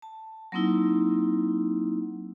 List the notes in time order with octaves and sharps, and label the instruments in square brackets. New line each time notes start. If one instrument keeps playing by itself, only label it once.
[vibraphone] A5
F#3 A#3 C4 D#4 E4